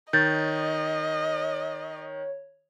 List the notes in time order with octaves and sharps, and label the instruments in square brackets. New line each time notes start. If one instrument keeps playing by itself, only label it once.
[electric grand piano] D#3 [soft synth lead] C#5 [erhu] D#5 [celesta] G6 A6